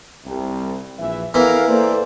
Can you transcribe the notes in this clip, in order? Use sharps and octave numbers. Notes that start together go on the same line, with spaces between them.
C2 C3
A#1 E3 E5
E3 B3 A4 A#4 F5
A#3 A4 C5 D5